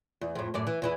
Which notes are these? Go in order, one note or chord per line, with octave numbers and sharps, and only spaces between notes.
E2
F2 A2
F#2 A2 D5
E3
E2 E3 E4